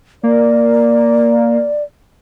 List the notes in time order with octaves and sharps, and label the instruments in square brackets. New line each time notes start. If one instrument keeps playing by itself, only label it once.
[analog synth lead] A#3 [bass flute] D5